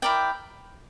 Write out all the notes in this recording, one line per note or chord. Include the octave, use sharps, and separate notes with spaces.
E4 A#4 D5 G5